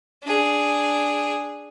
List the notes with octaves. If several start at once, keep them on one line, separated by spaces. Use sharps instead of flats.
D4 G#4